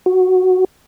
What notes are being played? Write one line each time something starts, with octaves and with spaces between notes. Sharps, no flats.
F#4